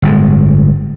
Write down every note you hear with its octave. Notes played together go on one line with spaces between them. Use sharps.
G1 A2 G#3